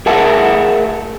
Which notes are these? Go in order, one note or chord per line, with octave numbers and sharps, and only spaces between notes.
G#4 A#4 E5 F#5 A5